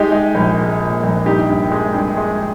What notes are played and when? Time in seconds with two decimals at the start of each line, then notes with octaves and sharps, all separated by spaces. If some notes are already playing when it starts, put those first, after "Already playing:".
Already playing: G#3 D#4 G4
0.12 G#3
0.35 A#1
0.59 G#3
0.81 A#2
1.03 A#1
1.26 G2 D#4 G4
1.49 G2
1.72 G#3
1.94 G2
2.17 G#3